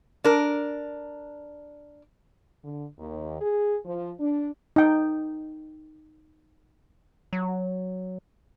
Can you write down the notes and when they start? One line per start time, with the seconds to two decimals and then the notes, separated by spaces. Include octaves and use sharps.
0.24 D4 A#4
2.63 D3
2.99 D#2
3.41 G#4
3.85 F3
4.19 D4
4.76 D#4 G5
7.33 F#3